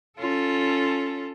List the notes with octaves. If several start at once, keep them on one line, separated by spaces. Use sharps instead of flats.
C#4 F4 A4